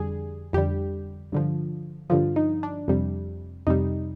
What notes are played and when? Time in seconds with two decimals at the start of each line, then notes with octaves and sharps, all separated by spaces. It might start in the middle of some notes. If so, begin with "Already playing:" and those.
Already playing: F2 D3 G3 G#4
0.53 F2 D3 G3 G4
1.32 G2 D3 F3
2.10 G2 D3 F3 F4
2.36 D#4
2.63 D4
2.88 F2 C3 G3
3.67 F2 C3 G3 D#4